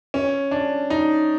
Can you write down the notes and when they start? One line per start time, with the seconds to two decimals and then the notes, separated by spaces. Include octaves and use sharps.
0.14 C#4
0.51 D4
0.90 D#4